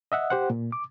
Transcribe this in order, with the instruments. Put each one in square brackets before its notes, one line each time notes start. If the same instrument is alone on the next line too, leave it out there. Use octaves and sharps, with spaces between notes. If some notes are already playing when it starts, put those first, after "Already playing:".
[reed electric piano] D#5 E5 F#5
G4 C5 F#5
A#2
D6